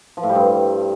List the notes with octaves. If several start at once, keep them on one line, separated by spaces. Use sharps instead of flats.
F3
A2
G3
G2